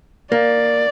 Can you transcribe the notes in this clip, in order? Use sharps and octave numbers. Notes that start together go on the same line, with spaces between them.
A#3 D5